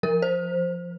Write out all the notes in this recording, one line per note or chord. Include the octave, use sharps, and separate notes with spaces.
F3 A#4
C5